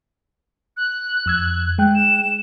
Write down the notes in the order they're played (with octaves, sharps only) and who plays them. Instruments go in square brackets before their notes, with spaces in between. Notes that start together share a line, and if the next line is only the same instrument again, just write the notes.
[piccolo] F#6
[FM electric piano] F2 E6 G#6
G#3 G5 F#6
[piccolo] E7